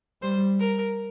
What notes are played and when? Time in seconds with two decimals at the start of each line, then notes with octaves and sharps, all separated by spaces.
0.22 G3 C5
0.60 A#4